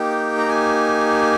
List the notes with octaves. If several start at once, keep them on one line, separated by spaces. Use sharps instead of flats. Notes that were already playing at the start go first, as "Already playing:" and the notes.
Already playing: A#3 D#4 G4 G5
A#5
G#5